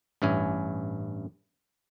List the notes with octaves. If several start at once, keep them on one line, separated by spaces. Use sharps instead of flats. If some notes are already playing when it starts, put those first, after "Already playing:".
A1 G2 C#4 E4 G#5